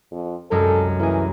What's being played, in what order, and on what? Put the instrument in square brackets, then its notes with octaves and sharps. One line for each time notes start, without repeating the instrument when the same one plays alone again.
[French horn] F2
[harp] C2 F#2 G#3 [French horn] A4
[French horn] E3 [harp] A#3 G#4